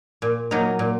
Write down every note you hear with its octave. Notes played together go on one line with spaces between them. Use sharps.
A#2
F#3 A#3 D#4
A#2